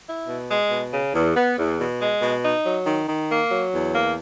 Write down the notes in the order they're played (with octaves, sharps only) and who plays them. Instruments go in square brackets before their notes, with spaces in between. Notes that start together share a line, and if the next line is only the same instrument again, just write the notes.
[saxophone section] E4
B2
G#3
B2
C#3
E2
B3
E2
B2
G#3
B2
D#4
F#3
D#3
D#3
A#3
F#3
E2
A#3